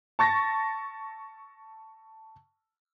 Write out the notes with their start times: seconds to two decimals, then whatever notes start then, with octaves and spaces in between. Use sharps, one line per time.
0.19 A5 C#6 A6 A#6